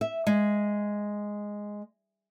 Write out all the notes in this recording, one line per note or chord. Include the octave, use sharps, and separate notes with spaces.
E5
G#3